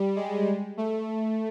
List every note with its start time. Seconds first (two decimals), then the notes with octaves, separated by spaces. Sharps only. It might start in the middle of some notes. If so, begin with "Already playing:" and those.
Already playing: G3
0.16 G#3
0.77 A3